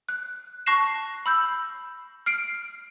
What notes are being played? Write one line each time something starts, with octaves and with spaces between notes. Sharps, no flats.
F#6
A5 C#6 F#6 A#6 C7 E7
B5 E6 G6
F6 C7 D7